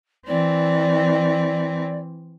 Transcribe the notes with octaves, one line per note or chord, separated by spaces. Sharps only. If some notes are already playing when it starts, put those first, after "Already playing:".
E3 C4 D5